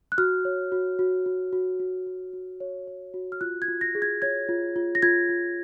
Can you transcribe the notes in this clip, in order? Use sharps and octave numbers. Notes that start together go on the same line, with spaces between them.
F#6
F#4 F6
C#5
F#4
F#4
F#4
F#4
F#4
F#4
F#4
C#5
C#5
F#4
F6
F4 F#6
G#6
F4
A#6
G#4
G#6
C#5 G#6
F4
F4
A#6
F4 G#6
F4